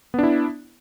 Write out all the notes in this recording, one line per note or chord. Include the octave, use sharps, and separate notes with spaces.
B3 D4 E4